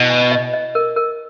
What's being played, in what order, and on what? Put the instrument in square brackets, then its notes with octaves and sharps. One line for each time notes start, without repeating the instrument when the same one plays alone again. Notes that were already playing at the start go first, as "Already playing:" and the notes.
Already playing: [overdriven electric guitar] B2 [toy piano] E4
[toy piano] G#5
D#5
D#5
A#4
A#4